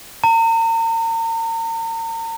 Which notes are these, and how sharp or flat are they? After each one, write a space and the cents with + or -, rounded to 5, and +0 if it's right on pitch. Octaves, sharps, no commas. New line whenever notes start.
A#5 -40